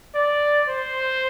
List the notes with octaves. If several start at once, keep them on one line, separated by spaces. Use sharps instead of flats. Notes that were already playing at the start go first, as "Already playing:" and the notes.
D5
C5